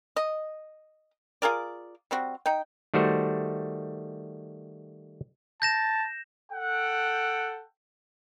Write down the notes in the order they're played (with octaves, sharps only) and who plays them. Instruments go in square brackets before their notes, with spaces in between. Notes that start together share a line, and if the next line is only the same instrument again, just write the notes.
[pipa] D#5
F4 G#4 A#4 D5
G3 C4 F#4
D#4 G5
[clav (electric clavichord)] D#3 G3 A3 F#4 C5
[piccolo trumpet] A5 [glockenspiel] G6 A#6 E7
[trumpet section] A4 F#5 G5